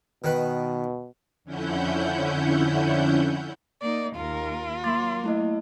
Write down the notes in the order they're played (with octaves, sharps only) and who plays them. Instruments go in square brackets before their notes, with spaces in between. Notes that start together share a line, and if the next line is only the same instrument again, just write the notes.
[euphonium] B2 [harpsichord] D#3 B4
[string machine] F2 D3 C#4 E4 F#5 G6
[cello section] A#3 D#4 [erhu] D5
[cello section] D#2 A#4 [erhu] F4
[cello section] F#3 A#3 [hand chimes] C6 D6 A6
[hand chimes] A3 E4 D#5